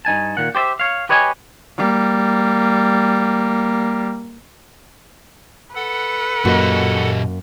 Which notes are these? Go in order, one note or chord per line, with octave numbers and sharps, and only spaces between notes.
G2 D#4 G#5 A5
A#2 D#3 F#5
G4 C5 D5 E5
C#5 F5
G4 B4 C#5 D#5 E5 G#5
G3 A#3
A4 B4 F#5
F#2 A#2 A#3 F#4 G4 D#5